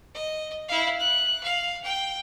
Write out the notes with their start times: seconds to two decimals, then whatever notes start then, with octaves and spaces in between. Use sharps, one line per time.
0.15 D#5
0.68 E4 F5
0.99 F#6
1.43 F5
1.84 G5